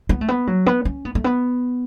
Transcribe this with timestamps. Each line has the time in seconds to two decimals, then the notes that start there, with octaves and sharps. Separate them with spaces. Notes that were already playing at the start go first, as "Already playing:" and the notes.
0.09 B3
0.21 A3
0.28 B3
0.47 F#3
0.66 B3
0.85 C#4
1.05 B3
1.15 A3
1.24 B3